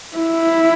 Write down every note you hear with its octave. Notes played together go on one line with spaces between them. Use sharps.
E4